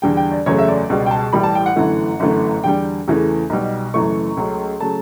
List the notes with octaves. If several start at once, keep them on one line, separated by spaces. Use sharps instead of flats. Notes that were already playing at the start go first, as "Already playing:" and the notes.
E2 D3 G3 G5
G5
D5
F#1 E2 C#3 F#3 A3 C#5
E5
D5
C#2 B2 G3
G5
A5
A1 A2 E3 G3 B5
A5
G5
F#5
G1 F#2 E3 A3
G1 F#2 E3 A3
E2 D3 G3 G5
E2 C#3 E3 A3
B1 B2 G3
F#1 F#2 E3 A3 C#6
C#2 C#3 F#3 A3
C#3 F#3 A3 A5